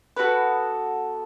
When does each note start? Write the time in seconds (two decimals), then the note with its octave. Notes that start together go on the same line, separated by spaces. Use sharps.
0.16 B3 F#4 A4 B4